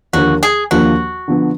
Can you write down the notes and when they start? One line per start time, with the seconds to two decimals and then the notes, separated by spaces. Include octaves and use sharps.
0.13 D#2 D3 F3 A#3 D4 F#4
0.43 G#4
0.71 D#2 D3 F3 A#3 D4 F#4
1.28 D3 F3 B3